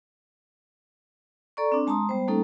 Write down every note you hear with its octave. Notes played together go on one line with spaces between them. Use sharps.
A4 D5 A#5 C#6
C4 D4
G#3 A5 A#5 C6 D#6
G3 B3 C5
G3 A3 A#3 C#4 D#4 A4